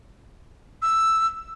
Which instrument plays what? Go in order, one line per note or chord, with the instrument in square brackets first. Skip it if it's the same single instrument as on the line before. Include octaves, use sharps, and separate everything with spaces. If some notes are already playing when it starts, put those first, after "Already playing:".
[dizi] E6